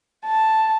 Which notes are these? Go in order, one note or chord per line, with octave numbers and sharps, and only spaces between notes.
A5